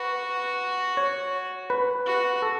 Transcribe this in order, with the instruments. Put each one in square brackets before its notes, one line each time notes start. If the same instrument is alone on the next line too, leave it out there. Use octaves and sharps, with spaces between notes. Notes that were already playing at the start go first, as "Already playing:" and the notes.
Already playing: [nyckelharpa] F#4 [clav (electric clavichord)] B4
[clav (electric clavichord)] C#5
B4
[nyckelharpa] F#4
[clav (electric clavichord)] A4